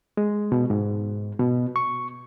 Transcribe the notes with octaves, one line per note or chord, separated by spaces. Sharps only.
G#3
B2
G#2
B2
C#6